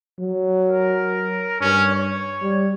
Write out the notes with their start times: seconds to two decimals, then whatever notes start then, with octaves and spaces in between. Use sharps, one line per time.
0.20 F#3
0.69 A#4
1.61 G2 C#4
1.93 C#5
2.42 G3